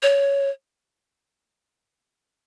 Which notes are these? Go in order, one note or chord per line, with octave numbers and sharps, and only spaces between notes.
C#5